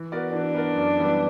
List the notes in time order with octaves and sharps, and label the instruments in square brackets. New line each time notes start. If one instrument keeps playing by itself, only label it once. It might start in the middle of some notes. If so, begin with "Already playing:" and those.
Already playing: [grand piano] E3
B3 F#4 A#4 D5
[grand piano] E3 [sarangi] D4
[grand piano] B3 F#4 A#4 D5
F#2
E3 G3 B3